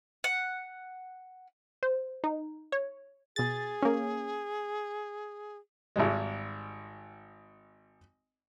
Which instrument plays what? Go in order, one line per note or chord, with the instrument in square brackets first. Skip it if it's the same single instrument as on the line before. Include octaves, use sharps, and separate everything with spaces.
[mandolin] F#5
[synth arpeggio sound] C5
D#4
C#5
[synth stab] B2 A6 [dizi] G#4
[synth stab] A#3 C#4
[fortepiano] G#1 G#2 G3 G#3